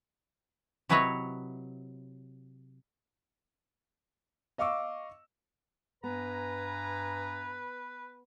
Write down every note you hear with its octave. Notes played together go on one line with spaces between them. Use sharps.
C3 F#3 E4 B4 C#5 D#5
D#5 F5 C#6 D6 E6
G2 B3 B4 G#5 A#5